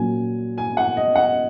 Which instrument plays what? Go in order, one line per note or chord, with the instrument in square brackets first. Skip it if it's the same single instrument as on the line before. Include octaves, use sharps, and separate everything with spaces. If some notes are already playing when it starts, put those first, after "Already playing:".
Already playing: [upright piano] A#2 F#3 A#3 C#4 G#5
G#5
F#5
D#5
F#5